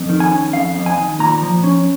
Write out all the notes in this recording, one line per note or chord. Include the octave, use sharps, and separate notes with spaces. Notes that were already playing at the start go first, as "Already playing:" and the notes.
Already playing: F2
D#3
G#5
C#4
F2 F5
F2
G#5
D#3
A#2 A#5
F3
C#4